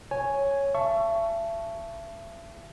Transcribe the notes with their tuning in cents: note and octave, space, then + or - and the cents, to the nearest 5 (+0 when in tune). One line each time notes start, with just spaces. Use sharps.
C#5 +0 G#5 +0
E5 +35 A5 +0 C#6 +5